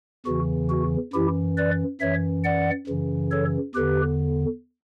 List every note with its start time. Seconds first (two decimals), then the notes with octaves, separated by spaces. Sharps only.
0.26 E2 C#3 E3 F#4
0.70 F#4
1.14 F#2 E3 E4 G4
1.58 B4 D5
2.00 F#2 E3 C#5 E5
2.44 D5 F#5
2.88 F#2 C#3 E3
3.31 A4 C#5
3.75 E2 D3 G4 B4